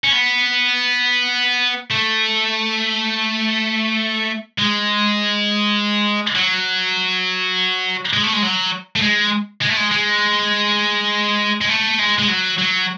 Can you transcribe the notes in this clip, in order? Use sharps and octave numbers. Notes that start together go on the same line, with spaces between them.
C#4
B3
A3
G#3
F#3
G#3
A3
G#3
F#3
A3
G#3
G#3
A3
G#3
G#3
G#3
A3
G#3
G#3
F#3
F#3